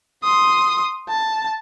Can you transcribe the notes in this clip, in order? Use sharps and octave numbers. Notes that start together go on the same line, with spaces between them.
C6 D#6
A5